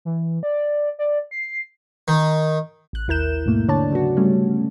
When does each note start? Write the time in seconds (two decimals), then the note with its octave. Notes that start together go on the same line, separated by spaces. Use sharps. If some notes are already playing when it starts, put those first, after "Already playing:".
0.05 E3
0.43 D5
0.99 D5
1.31 C7
2.08 D#3
2.93 A1 F#6
3.08 D#2 E4 A#4 G6 E7
3.46 G#2 B2 A3 A#3
3.68 D3 D4 C#5 D5 A5
3.91 C#3 F#3 B3 F#4
4.17 G3 A3 C#4